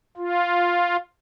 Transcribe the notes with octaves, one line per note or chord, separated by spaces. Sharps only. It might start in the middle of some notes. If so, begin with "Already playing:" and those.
F4